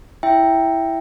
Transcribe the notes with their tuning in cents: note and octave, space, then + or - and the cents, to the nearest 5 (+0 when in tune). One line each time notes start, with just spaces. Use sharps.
E4 +0 E5 +0 G5 +0